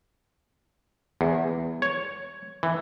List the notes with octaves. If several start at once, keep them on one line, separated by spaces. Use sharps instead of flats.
E2
C#5
E3